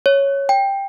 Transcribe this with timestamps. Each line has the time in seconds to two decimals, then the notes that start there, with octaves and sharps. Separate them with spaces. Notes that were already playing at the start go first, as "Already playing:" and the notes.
0.06 C#5
0.49 G5